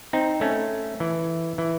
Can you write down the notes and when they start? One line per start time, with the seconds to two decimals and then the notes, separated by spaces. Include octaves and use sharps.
0.13 C4 D#4
0.41 A3 C#4
1.00 E3
1.58 E3